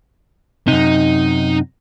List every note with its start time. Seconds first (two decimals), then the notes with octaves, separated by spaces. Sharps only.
0.68 F#2 C3 D#4